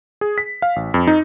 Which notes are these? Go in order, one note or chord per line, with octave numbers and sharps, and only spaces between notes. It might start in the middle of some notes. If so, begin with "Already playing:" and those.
G#4
B6
F5
A1
F2
D#4